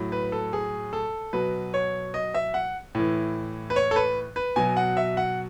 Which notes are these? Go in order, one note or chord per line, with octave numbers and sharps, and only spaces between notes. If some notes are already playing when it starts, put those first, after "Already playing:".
Already playing: A2 F#3
B4
A4
G#4
A4
B2 F#3 B4
C#5
D#5
E5
F#5
A2 E3
B4
C#5
A4
B4
B4
B2 F#3 G#5
F#5
E5
F#5